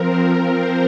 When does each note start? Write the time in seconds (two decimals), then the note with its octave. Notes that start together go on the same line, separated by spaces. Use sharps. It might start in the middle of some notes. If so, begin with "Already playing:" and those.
Already playing: F3 C4 A#4
0.49 C5